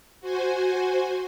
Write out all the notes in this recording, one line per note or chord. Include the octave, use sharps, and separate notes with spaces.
F#4 C5 G#5